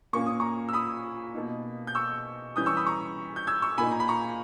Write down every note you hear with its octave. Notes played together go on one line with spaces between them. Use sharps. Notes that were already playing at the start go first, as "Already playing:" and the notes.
A#2 A#3 C#4 C#6
D#6
A#5 C#6
E6
B5 D#6
B2 A#3 D#4
G6
C#6 E6
E3 G3 C#4 D#6 G6
C#6 E6
B5 D#6
A#5 C#6
G6
E6 G#6
C#6 E6
A#2 A#3 D#4 G#5 B5
A#5
B5
A#5 C#6